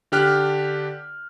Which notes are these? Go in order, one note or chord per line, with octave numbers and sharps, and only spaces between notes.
D3 D4 G4 F6 F#6